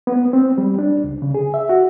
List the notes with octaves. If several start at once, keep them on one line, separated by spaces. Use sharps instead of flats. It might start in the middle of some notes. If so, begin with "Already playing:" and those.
B3
C4
G3
D4
C#2
C#3
G#4
E5
F#4